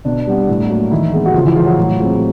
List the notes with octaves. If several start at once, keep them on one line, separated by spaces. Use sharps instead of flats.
B2 D4
G3 B3
A2
F#3 A#3
D#3 E3 E4
G#3 B3
F#4
C#3 F3 F4
E3 E4
F3 G#3 F4
F#3 F#4
A2
F3 G#3 C4